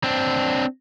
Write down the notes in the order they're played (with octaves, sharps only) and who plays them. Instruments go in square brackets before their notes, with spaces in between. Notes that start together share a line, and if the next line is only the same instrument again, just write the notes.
[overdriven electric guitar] C4 D4